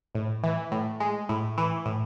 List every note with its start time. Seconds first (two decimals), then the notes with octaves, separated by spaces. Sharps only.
0.15 A2
0.43 E3
0.72 A2
1.00 G#3
1.29 A2
1.58 E3
1.86 A2